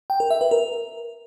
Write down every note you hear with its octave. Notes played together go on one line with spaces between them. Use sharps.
G5
A#4
E5
B4
A#4